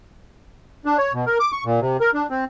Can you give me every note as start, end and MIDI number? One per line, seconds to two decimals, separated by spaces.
0.85 0.97 62
0.98 1.13 73
1.13 1.25 47
1.26 1.38 70
1.40 1.52 86
1.52 1.64 85
1.65 1.80 46
1.81 1.97 48
2.00 2.11 70
2.14 2.26 62
2.30 2.45 60